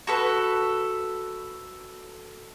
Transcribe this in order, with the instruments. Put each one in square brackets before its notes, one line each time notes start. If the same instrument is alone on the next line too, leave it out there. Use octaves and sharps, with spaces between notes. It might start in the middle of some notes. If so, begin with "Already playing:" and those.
[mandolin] F#4 A4 B4